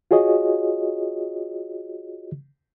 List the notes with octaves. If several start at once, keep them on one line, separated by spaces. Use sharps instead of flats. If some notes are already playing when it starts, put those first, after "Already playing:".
F4 F#4 G#4 C#5 D#5